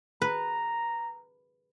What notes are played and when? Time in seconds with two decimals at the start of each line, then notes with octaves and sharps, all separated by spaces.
0.22 B4 A#5